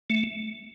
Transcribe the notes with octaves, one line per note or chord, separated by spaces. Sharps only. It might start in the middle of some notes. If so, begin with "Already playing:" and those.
A3